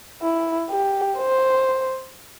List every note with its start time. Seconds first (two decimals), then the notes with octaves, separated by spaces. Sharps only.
0.22 E4
0.70 G4
1.18 C5